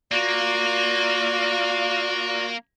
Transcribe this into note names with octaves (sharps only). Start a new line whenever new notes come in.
A#3 F4 F#4 D5